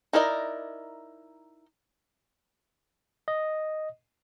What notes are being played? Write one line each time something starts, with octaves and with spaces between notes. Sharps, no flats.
D#4 E4 A#4 D5 D#5
D#5